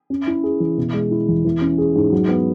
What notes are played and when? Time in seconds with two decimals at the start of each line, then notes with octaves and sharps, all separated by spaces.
0.10 C#4
0.27 E4
0.43 G#4
0.60 E3
0.78 B2
0.94 G#3
1.11 E4
1.28 E2
1.45 E3
1.61 C#4
1.78 G#4
1.95 G#2
2.12 F#3
2.29 B3